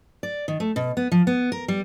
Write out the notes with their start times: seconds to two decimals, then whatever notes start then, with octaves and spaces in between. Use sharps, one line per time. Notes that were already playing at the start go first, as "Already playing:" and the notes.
0.23 D5
0.48 D#3
0.60 A3
0.76 B2
0.97 B3
1.12 F3
1.27 B3
1.52 A#4
1.68 G3